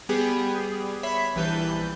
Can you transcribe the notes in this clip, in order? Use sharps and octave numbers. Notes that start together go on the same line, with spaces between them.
G3 B3 G4 G#4 G5
C#5 E5 B5 B6 C7
A#1 E3 G3 B4 A5 G6